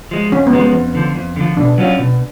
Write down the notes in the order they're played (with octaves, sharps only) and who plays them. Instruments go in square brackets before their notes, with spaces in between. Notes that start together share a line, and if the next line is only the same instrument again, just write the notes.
[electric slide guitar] F3 G#3
[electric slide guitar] F2 [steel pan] C#4
[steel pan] B3
[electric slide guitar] F3 G#3
[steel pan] B3
[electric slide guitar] F2
D3 F3
F2
D3 F3
[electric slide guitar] B2 [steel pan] D4
[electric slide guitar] F#3 C#4 F4
B2